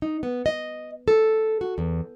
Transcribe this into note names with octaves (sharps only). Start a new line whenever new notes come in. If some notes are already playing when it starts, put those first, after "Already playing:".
D#4
B3
D#5
A4
F#4
E2